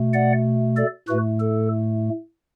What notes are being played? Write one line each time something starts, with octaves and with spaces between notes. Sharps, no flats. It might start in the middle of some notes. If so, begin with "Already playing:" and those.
Already playing: B2 A3
D5 F#5
A4 D5
A2 A3 F#4 B4
A4